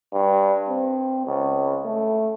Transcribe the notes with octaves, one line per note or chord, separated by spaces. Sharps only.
G2
C4
C#2
A3